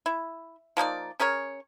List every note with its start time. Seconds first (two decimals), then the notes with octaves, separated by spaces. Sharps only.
0.06 E4
0.77 F3 A#3 D#4 D5
1.20 C#4 G#4 A#4 C#5